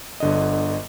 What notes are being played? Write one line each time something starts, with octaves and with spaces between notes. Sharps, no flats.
G1 D3 D#5